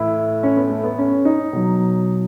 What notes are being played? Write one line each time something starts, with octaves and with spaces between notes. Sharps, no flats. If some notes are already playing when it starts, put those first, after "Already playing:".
Already playing: A2 E3 E4
C#4
B3
A3
B3
C#4
D#4
B2 F#3